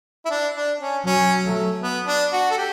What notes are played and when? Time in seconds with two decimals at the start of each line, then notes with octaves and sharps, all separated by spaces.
0.25 E4
0.31 D4
0.55 D4
0.81 C#4
1.06 F#3 C#4
1.44 A3
1.82 B3
2.07 D4
2.33 F#4
2.51 A4
2.58 G4